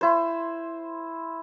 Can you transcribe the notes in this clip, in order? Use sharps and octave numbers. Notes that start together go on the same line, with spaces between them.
E4 C5